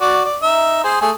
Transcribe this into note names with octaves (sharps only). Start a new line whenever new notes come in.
F#4 D5
D5
D#4 E5
G#4 C5
A3 G#4